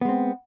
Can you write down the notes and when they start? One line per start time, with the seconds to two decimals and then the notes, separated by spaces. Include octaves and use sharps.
0.01 B3
0.05 G#3
0.09 C4